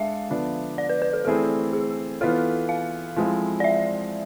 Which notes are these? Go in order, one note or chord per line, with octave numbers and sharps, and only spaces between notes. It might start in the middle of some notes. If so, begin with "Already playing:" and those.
Already playing: G#3 D4 A4 E5 F5
D3 F3 B3 D4 F4
D5
B4
B4
A4
E3 A3 C4 E4 G#4 A4
G#4
E3 B3 F4 A4
F5
F3 G#3 C4 E4
D5
E5